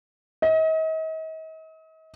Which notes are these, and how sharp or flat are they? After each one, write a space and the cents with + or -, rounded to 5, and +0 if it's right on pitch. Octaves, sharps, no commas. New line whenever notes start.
D#5 +40